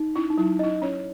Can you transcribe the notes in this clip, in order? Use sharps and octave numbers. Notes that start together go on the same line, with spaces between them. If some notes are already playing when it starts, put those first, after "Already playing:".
Already playing: D#4
C#4 E4
D#4
F#3 E4
C#4 E4 D#5
C#4 C#5